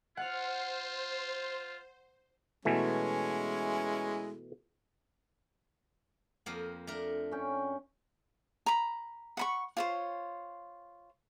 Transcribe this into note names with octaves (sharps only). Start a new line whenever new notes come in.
F4 C5 F#5 F6
B2 E3 G#3 A3 C#4 E4
F2 F3 A#3
A3 D4 A#4
C#4 G5
A#5 B5
F#5 B5 C#6
F4 C5 C#5